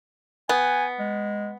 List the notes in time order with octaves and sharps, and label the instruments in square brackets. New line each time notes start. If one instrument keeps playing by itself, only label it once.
[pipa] B3 [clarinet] G#5
[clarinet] G#3